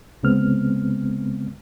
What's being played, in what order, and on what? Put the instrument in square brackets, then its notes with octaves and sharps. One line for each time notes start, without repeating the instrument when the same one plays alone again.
[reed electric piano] C2 C#3 G#3 B3 C4 F6